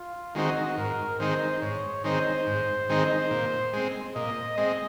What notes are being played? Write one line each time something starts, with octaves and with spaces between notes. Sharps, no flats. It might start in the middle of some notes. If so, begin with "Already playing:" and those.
Already playing: F4
D#3 G#3 C4 D#4 F#4
G#2 A#4
D#3 G#3 C4 D#4 C5
G#2 C#5
D#3 G#3 C4 D#4 C5
G#2
D#3 G#3 C4 D#4
A#2
G#3 C4
A#2 D#5
G#3 C4 D#5